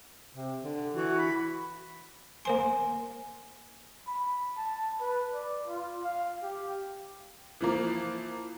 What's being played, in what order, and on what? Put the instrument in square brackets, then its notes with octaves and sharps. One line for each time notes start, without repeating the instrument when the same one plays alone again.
[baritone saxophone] C3
D3
[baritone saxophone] E3 [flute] F#4
[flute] B5
[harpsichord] A#3 C5 C6 [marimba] G#5
[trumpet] B5
A5
B4
D5
F4
F5
G4
[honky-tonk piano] E3 F3 A#3